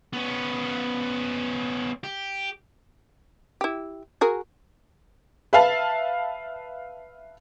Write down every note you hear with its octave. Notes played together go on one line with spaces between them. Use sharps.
B3 C#4
G4
E4 G4
F#4 G#4 A#4
B4 E5 F5 A5